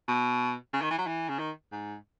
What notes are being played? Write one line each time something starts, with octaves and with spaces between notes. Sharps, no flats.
B2
C#3
D#3
E3
F#3
E3
C#3
D#3
G#2